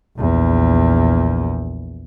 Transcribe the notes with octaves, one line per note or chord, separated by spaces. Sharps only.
A#1 E2